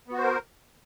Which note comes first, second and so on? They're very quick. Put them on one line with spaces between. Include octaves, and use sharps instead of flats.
B3 F#4 C5 A#4